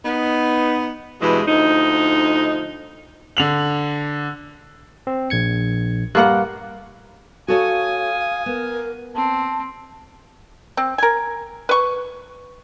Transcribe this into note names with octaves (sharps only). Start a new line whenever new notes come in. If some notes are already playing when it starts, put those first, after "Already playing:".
B3 D#4
G2 B2 E3 G#3
D2 F3 D#4
D3 F7 F#7
C4
A#1 G#6 C#7
G2 A#3 F#5 F#6
F#4 A4 C#5 F5 G#5 D#6
B3 A#4
C4 A5
C4
A#4 G#5
B4 C#6